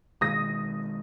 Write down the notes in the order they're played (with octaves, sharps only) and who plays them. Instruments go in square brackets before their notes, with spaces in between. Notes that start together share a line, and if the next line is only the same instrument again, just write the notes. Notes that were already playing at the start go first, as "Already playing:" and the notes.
[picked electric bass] B2 D#3 G#3 [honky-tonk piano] D#6 A#6